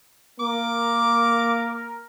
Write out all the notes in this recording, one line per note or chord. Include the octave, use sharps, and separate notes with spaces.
A#3 A#4 D6